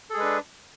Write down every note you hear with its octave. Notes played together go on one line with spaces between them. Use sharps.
G#3 D4 G#4 A4 B4